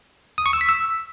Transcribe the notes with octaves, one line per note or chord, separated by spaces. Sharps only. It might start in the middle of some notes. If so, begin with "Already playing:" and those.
D#6
C#6
E6
B6
E6